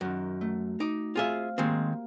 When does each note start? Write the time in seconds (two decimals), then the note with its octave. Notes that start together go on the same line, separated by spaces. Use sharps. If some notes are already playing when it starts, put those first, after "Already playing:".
0.01 F#2 D#3 F#4
0.41 A3
0.80 D#4 D6
1.15 C4 F4 G#4 E5 F5
1.58 D#3 G#3 A#3 C4 G4